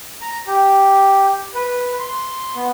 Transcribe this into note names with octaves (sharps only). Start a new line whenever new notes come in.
A#5
G4
B4
C6
B3